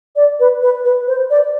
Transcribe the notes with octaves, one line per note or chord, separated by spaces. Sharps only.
D5
B4
B4
B4
C5
D5